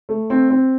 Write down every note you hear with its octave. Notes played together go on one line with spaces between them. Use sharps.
A3
C4
C4